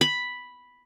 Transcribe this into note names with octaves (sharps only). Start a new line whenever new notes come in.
B5